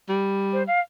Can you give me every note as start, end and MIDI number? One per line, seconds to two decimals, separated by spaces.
0.09 0.63 55
0.53 0.63 72
0.67 0.80 77